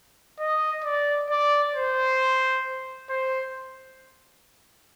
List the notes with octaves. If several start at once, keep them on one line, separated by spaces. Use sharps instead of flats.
D#5
D5
D5
C5
C5